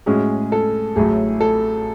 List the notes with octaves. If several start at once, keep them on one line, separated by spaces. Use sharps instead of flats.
A2 G#3 C#4 F#4 G#4
A4
A1 A2 F#3 A3 G#4
A4